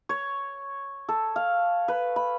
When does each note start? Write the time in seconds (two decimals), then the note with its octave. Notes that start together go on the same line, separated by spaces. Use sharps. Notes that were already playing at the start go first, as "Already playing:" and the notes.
0.09 C#5
1.09 A4
1.36 F5
1.88 B4
2.16 B5